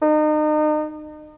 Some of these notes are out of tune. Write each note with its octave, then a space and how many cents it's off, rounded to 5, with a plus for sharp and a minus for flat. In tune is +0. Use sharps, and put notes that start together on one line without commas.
D#4 -35